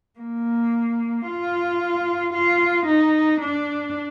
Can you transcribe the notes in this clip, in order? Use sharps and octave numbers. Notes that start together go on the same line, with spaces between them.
A#3
F4
F4
D#4
D4